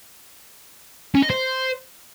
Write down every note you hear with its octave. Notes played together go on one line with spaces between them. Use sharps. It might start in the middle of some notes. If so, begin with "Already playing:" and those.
C#4
D#5
C5